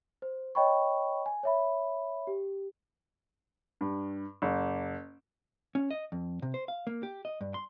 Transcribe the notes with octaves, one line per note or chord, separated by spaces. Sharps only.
C5
C#5 D#5 G5 B5 C#6
G#5
C#5 E5 B5
G4
G2
F#1
C#4
D#5
F2
C3
C5
F5
A#3
G4
D#5
G2
C6